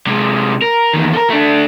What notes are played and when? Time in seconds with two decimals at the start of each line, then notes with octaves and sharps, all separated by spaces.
0.06 C3 G#3
0.62 A#4
0.93 E2 D#3
1.13 A4 A#4
1.30 A3 D4